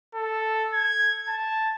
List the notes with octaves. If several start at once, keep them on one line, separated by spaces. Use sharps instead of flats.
A4
G#6
A5